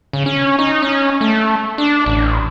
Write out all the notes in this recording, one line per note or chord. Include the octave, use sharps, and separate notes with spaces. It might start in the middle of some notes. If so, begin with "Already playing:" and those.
C#3
C#4
D#4
C#4
A3
D4
A1